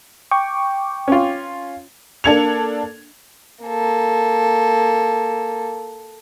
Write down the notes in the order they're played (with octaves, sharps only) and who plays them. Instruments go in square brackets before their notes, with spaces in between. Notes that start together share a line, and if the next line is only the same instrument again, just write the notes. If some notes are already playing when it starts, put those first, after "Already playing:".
[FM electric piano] G5 C#6 D6
[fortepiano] C#4 F4
[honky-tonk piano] A#3 D4 A4 G#6 C#7 F7
[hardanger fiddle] A#3 A4